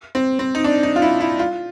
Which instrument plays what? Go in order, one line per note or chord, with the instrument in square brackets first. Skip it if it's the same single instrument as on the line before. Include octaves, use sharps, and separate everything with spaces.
[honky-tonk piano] C4
C4
D#4
D4
D#4
F4
E4
E4
F4